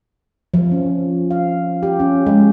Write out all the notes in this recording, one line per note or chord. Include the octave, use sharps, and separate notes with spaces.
F3
C#4
F5
G4
C#4
G#3